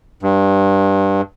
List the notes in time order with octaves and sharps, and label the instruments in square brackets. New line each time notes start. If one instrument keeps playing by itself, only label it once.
[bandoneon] G2